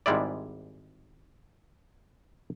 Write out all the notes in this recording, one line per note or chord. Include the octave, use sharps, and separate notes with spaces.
G#1 G#2 G3 G#3 E4 D5